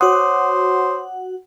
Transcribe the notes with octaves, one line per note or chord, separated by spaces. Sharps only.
F#4 C5 C#5 F#5 D6 D#6